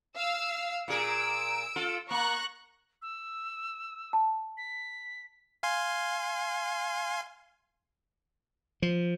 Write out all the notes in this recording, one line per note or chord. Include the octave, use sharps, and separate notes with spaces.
F5 E6
A#2 G#4 A#4 E6 D7
F4 A4
A#3 A#5 C#6 F#6
E6
A5
B6
F5 G#5 C6
F3